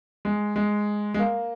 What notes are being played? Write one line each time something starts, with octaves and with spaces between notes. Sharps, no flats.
G#3
G#3
G#3
A#3